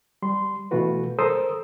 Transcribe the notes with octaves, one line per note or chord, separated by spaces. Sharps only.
G3 C6
B2 E3 A3 F4 F#4 B4
A4 A#4 C5 D#6 E6